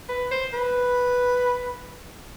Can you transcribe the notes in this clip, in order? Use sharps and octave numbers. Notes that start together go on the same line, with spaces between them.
B4
C5
B4